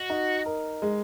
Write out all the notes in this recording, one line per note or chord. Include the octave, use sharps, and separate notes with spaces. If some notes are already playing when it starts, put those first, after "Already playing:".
Already playing: F#4 D#5
D#4
A#4
G#3